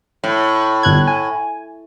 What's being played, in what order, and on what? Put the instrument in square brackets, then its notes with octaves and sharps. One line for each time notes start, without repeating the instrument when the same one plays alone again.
[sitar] A2
[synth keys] G1 F#6 G#6
G#5